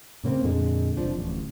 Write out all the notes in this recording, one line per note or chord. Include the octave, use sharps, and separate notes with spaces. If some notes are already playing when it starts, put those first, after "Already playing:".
A2 C#3 A#3 C4
F2 A#2 D3 G#3
E1 C2 F3 D4
D1 A1